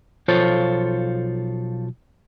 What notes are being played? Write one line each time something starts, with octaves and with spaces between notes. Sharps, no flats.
B1 F3 F4 A4 C5 C#5